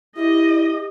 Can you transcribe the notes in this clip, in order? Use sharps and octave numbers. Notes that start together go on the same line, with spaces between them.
E4 G4 D#5